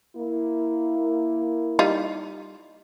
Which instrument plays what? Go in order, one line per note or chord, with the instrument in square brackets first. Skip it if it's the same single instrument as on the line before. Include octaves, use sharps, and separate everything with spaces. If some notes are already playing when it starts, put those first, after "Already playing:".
[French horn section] A#3 E4
[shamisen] G3 D#4 F4